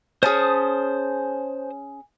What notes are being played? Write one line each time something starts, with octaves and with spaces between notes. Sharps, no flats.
C#4 G#4 C5 A5 D#6